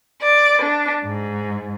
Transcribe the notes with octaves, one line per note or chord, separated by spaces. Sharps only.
D5
D4
G#2